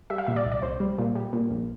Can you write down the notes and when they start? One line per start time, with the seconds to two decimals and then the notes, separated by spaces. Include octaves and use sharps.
0.10 G3 E5
0.18 F5
0.27 A#2 E5
0.36 D5
0.45 C2
0.52 D5
0.62 C2 C5
0.80 G3
0.98 A#2
1.16 G3
1.33 A#2
1.51 A#1